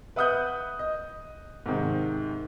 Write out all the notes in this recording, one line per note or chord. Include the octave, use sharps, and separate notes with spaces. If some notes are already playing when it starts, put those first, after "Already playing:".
B4 E5 F#5 D#6 F#6 G6
D#5
G#2 C3 D#3